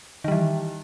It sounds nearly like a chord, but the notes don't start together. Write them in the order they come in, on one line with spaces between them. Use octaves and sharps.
D#3 G3 E3